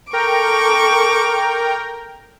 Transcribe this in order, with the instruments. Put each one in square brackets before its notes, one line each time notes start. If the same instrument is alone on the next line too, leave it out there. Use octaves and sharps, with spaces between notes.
[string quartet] A4 C#6 D6 [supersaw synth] A#4 G5 A#5